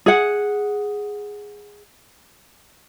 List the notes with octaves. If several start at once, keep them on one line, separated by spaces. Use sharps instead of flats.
G#4 F#5